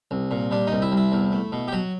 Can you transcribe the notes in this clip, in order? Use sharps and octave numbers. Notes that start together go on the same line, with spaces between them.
C2
A#2
G3 D4
C2 D#4
E4
C2 E4
E2
A3
B2
G4
F#3 F#4